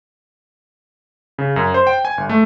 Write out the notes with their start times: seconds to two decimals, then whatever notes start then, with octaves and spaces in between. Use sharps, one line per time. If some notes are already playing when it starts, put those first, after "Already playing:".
1.38 C#3
1.56 F#2
1.74 C5
1.87 G5
2.05 G#5
2.18 G1
2.29 A3